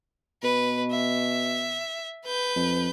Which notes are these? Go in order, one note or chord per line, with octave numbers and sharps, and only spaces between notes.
B2 B4
E5
B4 G6
F2